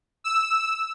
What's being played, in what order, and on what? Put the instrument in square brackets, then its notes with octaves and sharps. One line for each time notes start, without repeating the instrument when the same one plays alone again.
[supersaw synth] E6